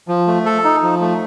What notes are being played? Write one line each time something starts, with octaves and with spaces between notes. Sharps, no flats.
F3
A3
A4
D#4
F3
A3